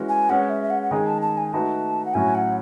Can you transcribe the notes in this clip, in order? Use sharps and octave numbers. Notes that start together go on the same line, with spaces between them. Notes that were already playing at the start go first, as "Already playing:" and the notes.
Already playing: E3 G#3 C#4 F#4
G#5
G#3 C#4 G#4 B4 F#5
E5
E5
F#5
F#5
D#3 G#3 D#4 G#4 G#5
A5
A5
G#5
A3 D#4 F#4 B4 A5
F#5
A2 F#3 C#4 F#4 G#5
F#5